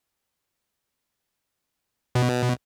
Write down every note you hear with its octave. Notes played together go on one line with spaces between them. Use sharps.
B2